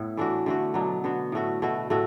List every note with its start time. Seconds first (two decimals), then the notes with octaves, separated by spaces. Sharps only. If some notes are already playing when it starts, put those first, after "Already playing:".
Already playing: A2 B3 E4
0.17 E3 A3 D4 F#4
0.46 D3 A3 F#4
0.74 B2 F#3 B3 D4
1.04 D3 B3 F#4
1.32 A2 A3 F#4
1.62 B2 A3 F#4
1.90 A2 A3 F#4